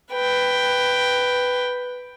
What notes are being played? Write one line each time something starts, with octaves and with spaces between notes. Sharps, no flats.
B4 G5